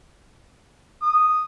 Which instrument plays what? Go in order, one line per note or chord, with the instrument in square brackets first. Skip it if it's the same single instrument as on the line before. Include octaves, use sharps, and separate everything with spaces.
[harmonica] D#6